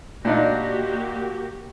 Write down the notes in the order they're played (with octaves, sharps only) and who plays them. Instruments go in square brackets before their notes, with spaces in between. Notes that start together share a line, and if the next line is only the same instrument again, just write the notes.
[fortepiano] A#2 D4 D#4 [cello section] A#3 F#4 G4